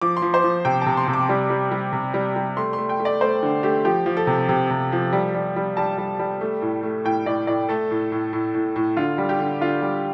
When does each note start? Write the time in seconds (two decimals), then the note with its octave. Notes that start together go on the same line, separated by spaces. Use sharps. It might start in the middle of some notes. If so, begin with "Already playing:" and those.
0.02 F3 D6
0.17 C6
0.22 F3
0.34 C5
0.44 F3
0.65 C3 G5
0.82 C3 A5
0.97 C6
1.08 C3
1.13 D6
1.29 G3
1.50 G3
1.72 G3
1.93 C3
2.14 G3
2.36 G3
2.57 A3 C6
2.73 A3 C6
2.89 G5
2.99 A3
3.05 D5
3.21 A3 C5
3.43 D3
3.63 A3 G4
3.85 F3 G4
4.06 F3
4.17 A4
4.27 C3
4.49 C3
4.70 C3
4.92 F3
5.13 G3
5.34 G3
5.56 G3
5.77 G3 A5
5.98 G3
6.19 G3
6.41 A3
6.62 A2
6.83 A3
7.05 A2 G5
7.26 A2 D5
7.47 A2 D5
7.69 A3 A4
7.91 A2
8.12 A2
8.33 A2
8.54 A2
8.76 A2
8.97 D3 F4
9.18 G3
9.29 G4
9.39 D3
9.61 D3 F4
9.82 G3